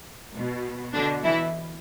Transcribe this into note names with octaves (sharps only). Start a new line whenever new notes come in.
B2
B2 D3 D4
E3 E4